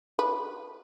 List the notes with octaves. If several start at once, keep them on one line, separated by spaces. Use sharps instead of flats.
B4